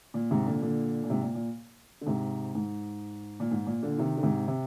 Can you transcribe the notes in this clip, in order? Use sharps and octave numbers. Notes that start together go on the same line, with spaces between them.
A#2
G#2 C3
A#2 D3
A#2 D3
A#2
G#2 C3
A#2
A#2
D3
G#2 C3
G#2
A#2
G#2
A#2
A#2 D3
C3 D#3
D3
G#2 C3
C3